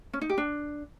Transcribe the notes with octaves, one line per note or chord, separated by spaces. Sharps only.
C#4
D#4
G4
D4